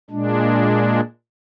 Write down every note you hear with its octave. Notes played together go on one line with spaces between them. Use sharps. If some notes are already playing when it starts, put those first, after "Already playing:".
A#2 G#3 D4